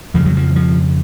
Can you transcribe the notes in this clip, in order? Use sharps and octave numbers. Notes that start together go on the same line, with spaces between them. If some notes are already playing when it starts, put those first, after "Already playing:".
F2 C#3 F3
F#3
F3
F3